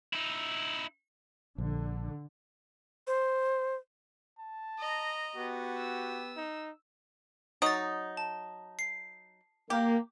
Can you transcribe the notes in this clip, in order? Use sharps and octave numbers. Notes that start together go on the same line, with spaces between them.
D#4 E4
A#1 D3
C5
A5
D#5 A#5
B3 F#4 G4
E6
D#4
F#3 D#4 D#6 A6
A5
C7
A#3 G4